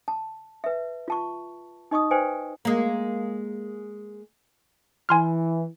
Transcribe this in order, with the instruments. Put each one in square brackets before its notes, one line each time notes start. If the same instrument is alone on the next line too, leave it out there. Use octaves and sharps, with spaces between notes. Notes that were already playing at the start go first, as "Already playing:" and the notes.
[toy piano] A5
B4 E5
F4 A5 C#6
D#4 D#5 C#6 D#6
B4 C5 D5 G5 G#5
[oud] G#3 A#3
[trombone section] E3 [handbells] G#5 C6 F6